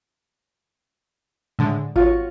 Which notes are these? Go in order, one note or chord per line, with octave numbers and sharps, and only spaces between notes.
A2 D3 G#3
G#1 F4 F#4 C#5